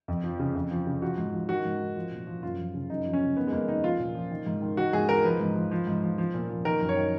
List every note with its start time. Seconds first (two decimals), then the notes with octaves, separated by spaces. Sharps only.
0.08 F2
0.24 F3
0.39 C#3
0.55 F2
0.71 F3
0.87 C#3
1.02 F3 F#4
1.18 G#2
1.34 F3
1.49 D#3 F#4
1.65 G#2
1.80 D#3
1.96 F3
2.12 A#2
2.27 F3
2.43 F#2 F4
2.58 F3
2.74 C#3
2.90 F#2 D#4
3.06 F3
3.13 C#4
3.21 C#3
3.37 D#3 B3
3.47 G#3
3.52 F2 A#3
3.68 D#3 D#4
3.84 F3 F4
3.99 A#2
4.15 F3
4.31 D#3
4.46 G#2
4.62 D#3
4.77 D#3 F#4
4.93 G#2 G#4
5.09 D#3 A#4
5.25 F3 B4
5.40 G#2
5.56 F3
5.71 F3
5.87 G#2
6.03 F3
6.18 F3
6.34 A#2
6.50 F3
6.65 D#3 A#4
6.81 F#2
6.89 C#5
6.97 D#3